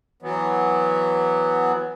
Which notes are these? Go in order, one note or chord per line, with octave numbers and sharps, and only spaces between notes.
E3 F#3 B3